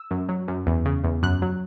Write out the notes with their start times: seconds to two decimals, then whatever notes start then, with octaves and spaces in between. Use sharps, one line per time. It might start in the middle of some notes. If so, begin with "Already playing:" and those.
Already playing: E6
0.11 F#2
0.29 F#3
0.48 F#2
0.67 E2
0.86 C#3
1.04 E2
1.23 F#2 F#6
1.42 F#3